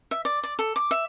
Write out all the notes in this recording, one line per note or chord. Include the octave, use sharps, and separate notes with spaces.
E5
D5
D5
A4
D6
E5